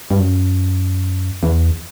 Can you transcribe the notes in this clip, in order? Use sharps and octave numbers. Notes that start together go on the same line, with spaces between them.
G2
F#2
E2